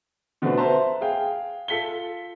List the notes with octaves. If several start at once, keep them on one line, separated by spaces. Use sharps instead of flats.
B2 D3 A3 C4 F#4 B4
B4 C5 E5 A5 A#5 C6
G#4 F5 G5
F4 A4 B6 C#7 G7